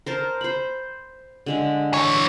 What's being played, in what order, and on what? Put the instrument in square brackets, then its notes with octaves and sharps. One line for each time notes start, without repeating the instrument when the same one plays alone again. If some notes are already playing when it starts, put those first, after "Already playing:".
[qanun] A#4 C5 A5
C5 B5
D3 G#3 E5
[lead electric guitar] E3 C#5